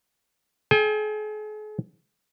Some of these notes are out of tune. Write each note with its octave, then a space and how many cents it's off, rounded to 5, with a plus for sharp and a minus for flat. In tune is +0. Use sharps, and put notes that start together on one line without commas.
G#4 +45 G5 +45